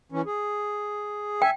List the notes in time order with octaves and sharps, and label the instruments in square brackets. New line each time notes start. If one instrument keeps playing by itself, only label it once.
[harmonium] E3 C#4
G#4
[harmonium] E5 G#5 [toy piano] G5